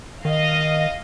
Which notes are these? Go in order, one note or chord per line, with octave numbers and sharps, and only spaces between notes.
D#3 D#5 F5